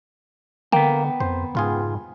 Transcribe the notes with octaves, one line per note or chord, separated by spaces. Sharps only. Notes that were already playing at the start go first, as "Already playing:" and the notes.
D3 A#3 B3 G5
F2 C5
C#2 G#2 F4 G#4